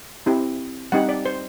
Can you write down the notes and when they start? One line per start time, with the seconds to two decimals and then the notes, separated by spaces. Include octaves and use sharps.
0.26 C4 E4 G4
0.92 G3 C4 D#4 G4 F#5
1.09 D5
1.25 C5